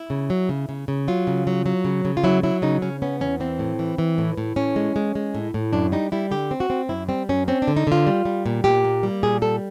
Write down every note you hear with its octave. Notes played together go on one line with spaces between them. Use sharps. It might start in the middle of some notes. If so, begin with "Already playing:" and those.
Already playing: E4
C#3
F#3
C#3
C#3
C#3
F#3 F4
C#3
F#3
F#3
C#3
C#3
F4
F#3 E4
F#3 E4
C#3 D#4
C#3 C#4
B3 C#4
E2 C#4
E3 C4
A2
E3
E3
A2
A2
A2 C#4
G#3
G#3
G#3
A2
A2
F#2 D4
G3 D#4
G3 E4
D3 G4
C4
F#4
C4
F#2 E4
G3 C4
F#2 C#4
C4 C#4
D4
D3
D#4
D3 F4
G3
G3
A#2
A#2 G4
A#3
G3
A#2 G#4
G3 A4